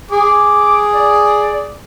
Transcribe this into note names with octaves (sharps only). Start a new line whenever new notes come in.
G#4 D6
D5